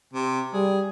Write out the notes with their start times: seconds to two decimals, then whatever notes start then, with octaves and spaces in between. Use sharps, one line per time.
0.14 C3
0.54 G3 G#4